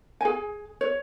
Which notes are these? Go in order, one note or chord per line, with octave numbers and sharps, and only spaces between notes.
G#4 G#5
C#5